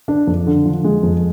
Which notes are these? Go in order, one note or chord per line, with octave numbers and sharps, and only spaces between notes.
D4
F2
D3
F3
G#3
F2